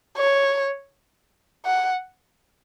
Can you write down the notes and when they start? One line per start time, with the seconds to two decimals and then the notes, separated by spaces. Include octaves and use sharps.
0.17 C#5
1.66 F#5